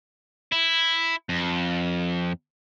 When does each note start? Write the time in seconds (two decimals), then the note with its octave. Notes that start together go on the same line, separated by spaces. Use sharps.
0.52 E4
1.29 F2